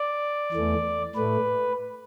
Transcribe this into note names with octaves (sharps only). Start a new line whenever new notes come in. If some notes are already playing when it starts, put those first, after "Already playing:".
Already playing: D5
E2 E3 A3
A2 A3 B4